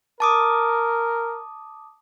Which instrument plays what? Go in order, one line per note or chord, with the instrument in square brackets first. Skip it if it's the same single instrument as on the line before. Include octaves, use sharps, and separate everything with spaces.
[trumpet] A#4 [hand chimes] A5 D6 D#6